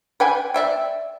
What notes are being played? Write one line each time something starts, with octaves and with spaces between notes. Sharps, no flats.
B4 G5 G#5
D5 E5 G5